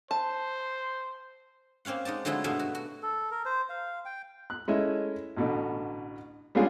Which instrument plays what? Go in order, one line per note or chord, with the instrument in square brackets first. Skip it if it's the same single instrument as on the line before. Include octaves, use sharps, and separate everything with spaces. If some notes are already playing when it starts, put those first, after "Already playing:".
[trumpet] C5 [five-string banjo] A5
[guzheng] A#3 C4 C#4 F5 F#5
G#3 D#4 D5 A5
D3 F3 F#3 G#3 A3 E4
G2 B2 G#3 A3 E5 F5
F#4
F#4
[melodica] A4
A#4
C5
F5
G5
[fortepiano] F#6
G#3 A3 C#4 E4 D#5 E5
A1 B2 D3
G3 G#3 C#4 D4 F4 G#4